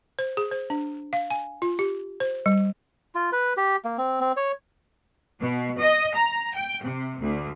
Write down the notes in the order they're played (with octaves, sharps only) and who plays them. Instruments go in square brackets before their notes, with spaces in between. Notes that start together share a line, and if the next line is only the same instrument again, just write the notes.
[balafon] C5
G#4
C5
D4
F5
G#5
F4
G4
C5
G3
[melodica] F4
B4
G4
A#3
C4
C4
C#5
[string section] B2
D#5
A#5
G5
C3
D2